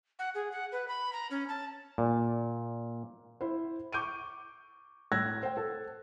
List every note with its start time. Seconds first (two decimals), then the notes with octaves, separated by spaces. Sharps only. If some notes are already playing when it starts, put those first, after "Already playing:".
0.19 F#5
0.35 G#4
0.52 F#5
0.72 B4
0.88 B5
1.13 A#5
1.31 C#4
1.49 A5
1.98 A#2
3.41 E4 C5
3.93 C#6 D6 G6 D7 D#7
5.12 A2 E6 F#6 G#6 A#6
5.43 C5 G5
5.57 A4